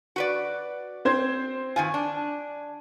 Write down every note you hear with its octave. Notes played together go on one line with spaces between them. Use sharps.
F#4 B4 D5
C4 C5 G#6
D#3 E3 F4 G#5
D4